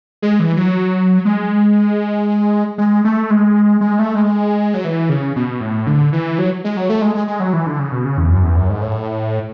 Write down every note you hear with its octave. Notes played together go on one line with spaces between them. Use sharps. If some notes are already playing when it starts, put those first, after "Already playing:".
G#3
E3
F#3
G#3
G#3
A3
G#3
G#3
A3
G#3
F#3
E3
C#3
B2
A2
D3
E3
F#3
G#3
F#3
A3
G#3
G#3
G#3
F#3
E3
D3
C#3
B2
C#3
E2
F#2
E2
F#2
G#2
A2